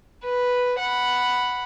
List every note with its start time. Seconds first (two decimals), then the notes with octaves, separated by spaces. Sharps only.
0.23 B4
0.79 F#5 B5